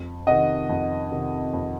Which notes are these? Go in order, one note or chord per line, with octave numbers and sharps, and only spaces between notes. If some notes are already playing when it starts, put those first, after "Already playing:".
Already playing: F2
C3 D#3 D#5 F#5
F2
C3 D#3
F2